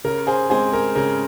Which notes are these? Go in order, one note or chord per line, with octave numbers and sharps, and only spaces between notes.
C#3 A#4
G#4 C5
G#3 C4 G#4 C5
A#4
C#3 A#4